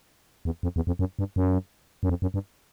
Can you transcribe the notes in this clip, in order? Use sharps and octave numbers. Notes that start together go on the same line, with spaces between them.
E2
F2
E2
F2
F#2
G2
F#2
F#2
F2
F#2
G2